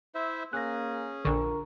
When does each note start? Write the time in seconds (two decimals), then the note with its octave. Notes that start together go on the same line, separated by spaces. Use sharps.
0.15 E4 C5 E5
0.53 A#3 C#4 G#4 F#6 A#6
1.25 A#1 D3 D4 A#4 C#6